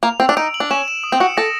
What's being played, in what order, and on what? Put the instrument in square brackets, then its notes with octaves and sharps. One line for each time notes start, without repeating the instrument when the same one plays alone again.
[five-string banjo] A#3 [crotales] F7
[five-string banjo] C4 [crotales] E6
[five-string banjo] D4
[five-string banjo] D#4 [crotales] D7
[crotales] F#7
[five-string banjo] D4
[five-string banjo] C#4 [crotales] E7
[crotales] E7
D#6
[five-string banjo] C4
[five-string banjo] F#4 [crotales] C#7
[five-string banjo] A4 [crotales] A#6